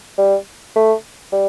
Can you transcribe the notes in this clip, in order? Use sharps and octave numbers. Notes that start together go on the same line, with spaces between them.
G3
A3
G3